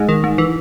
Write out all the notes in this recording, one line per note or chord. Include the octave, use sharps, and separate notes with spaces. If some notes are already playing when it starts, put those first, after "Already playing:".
Already playing: G#2 G#3
D#3
G#2
E3